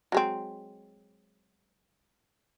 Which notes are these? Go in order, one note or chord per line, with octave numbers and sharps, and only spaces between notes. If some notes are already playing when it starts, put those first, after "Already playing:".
F#3 G#3 C4